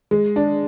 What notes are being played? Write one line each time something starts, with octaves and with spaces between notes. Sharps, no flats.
G#3
D4